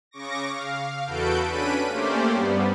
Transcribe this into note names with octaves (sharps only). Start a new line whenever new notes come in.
C#3 C#6 D6 A#6
F5
E2 F#4 A4 B4 G6 D7
C#4 D4 B4 B6 D7 D#7
A3 A#3 C#4 G4 C5 D5
G2 G3 B3